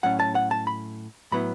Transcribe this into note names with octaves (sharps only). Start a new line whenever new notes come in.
A2 F#3 C#4 F#5
A5
F#5
A5
B5
A2 F#3 B3 E4 B5